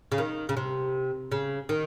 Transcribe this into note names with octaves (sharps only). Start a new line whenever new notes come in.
C#3
D#3
C#3
C3
C#3
D#3